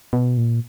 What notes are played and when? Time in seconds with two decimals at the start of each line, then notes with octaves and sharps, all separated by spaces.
0.13 B2
0.38 A#2